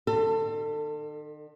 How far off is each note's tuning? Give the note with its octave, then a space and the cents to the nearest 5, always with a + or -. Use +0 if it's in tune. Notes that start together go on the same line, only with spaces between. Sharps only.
D#3 -45 A4 +25